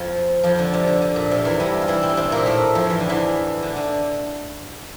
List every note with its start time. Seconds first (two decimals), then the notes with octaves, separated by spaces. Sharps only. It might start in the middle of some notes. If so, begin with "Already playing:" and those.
Already playing: F2 F3
0.43 F2 F3
0.59 D3
0.74 C3
0.87 D3
1.02 D3
1.16 A#2
1.31 C3
1.45 E2 E3
1.60 G2 G3
1.82 F4
1.88 E3 E4
2.03 C3 C4
2.17 C3 C4
2.32 A#2 A#3
2.46 A2 A3
2.75 F2 F3
2.90 E3
3.00 D3
3.09 E2 E3
3.62 D3
3.76 D3